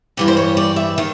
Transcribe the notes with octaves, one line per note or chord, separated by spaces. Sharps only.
G2 E3 G3 D5
C5
C#5
D5
E5
D#3